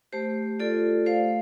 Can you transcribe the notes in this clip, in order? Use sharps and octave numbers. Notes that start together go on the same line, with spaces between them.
A3 G4 C5
F4 A4 D5
A3 C5 F5